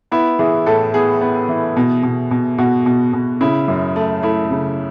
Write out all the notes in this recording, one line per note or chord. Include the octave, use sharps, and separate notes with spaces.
B3 E4
E3 G#4
A2 A4
B3 G#4
B3
E3
B2
B2
B2
B2 F#4
B2
B2
C#3 E4
F#2
A3
A3 E4
C#3